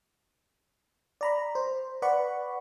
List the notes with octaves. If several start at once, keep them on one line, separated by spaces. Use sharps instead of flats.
D5 A#5 B5
C5
B4 D5 F#5 B5 C#6